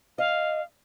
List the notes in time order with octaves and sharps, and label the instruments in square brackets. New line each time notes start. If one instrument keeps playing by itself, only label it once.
[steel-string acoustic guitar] D#5 [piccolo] F5